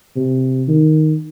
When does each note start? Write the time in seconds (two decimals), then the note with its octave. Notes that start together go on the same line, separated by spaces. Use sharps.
0.16 C3
0.68 D#3